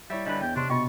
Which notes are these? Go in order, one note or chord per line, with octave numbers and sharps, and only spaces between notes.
G3 E4 C#5 E5
D3 G3 D4 B4 D#5
E2 G5
C3 D4 G4 C6 C#6
B2 F4 D#5 G5 C#6